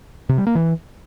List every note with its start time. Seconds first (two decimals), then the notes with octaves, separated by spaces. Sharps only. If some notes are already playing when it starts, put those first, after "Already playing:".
0.29 C3
0.38 G3
0.47 A#3
0.55 E3